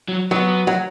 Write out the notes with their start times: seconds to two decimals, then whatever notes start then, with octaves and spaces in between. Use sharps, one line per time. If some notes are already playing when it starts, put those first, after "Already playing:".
0.08 F#3
0.31 F#3 B3
0.67 F#3